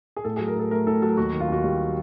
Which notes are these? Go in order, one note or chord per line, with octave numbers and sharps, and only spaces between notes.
G#4
A2 A4
G#4
F#3
A#4
A2 A4
A3 A#4
A2 A4
F#3 A4
D#2 F#4
D#3
F4
D#2 F#4
G3